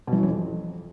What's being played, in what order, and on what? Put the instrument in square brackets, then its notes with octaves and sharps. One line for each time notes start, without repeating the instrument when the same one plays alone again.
[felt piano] B2
E3
F#3
E3
F2